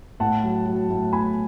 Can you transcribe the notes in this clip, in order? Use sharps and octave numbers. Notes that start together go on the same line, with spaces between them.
A2 F#5 A5
F#3
F#3
A2
A2 G#5 B5